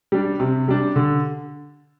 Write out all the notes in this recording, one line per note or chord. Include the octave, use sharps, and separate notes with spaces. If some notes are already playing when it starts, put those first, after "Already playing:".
G3 D4
C3
G3 D4
D3